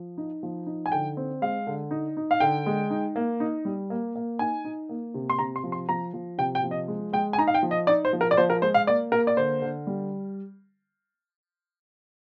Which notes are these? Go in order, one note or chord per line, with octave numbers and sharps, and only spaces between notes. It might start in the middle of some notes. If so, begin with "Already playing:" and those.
Already playing: F3
D#4
F3
D#4
G#5
D3 G5
C4
G#3 F5
D3
D#4
D#4
F5
D3 G5
G#3
D#4
A#3
D#4
G3
A#3
A#3
D#4 G#5
D#4
A#3
C3
C6
C3 A#5
C6
F3
C6
F3 A#5
F3
C3 G5
G5
F3
D#5
G#3
G#3 G5
G#5
D#4 A#5
F5
G5
F3
D#5
D#4 D5
C5
F3
A#4
D5
F3 C5
A#4
G#3 C5
F5
A#3 D5
A#3 A#4
D5
D3 C5
D3
G3